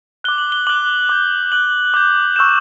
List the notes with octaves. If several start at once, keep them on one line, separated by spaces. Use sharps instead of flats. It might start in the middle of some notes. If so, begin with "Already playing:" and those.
D6 F#6 G7
F#7
G7
D6 F#6 F#7
D6 G6
D6 F#6 F#7
D6 G6
C#6 E6 G6 E7